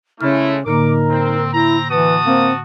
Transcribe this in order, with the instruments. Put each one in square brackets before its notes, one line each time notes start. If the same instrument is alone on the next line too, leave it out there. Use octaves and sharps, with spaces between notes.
[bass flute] C#3 [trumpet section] G#3 A3 [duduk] E4 [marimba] F6
[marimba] A2 D3 A#3 [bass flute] D#4 [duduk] A#4 [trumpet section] D6
[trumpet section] C4
[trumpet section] C4 A#5 [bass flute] E4
[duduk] E3 [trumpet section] F#4 A5 D#6 [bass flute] B4
[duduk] A#3 [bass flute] C4